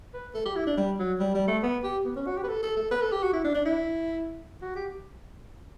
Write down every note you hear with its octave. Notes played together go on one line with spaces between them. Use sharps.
B4
A4
G4
E4
D4
G3
F#3
G3
G3
A3
B3
G4
B3
C#4
F#4
G4
B4
A4
A4
A4
B4
A4
G4
F#4
E4
D4
D4
E4
F#4
G4